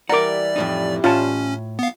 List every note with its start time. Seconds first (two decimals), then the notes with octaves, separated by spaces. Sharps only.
0.09 E3 G3 A#4 D5 F#5 A#5 D6
0.56 F2 A2 D#4
1.04 A2 C#4 F4 C#5 A5
1.79 B3 F5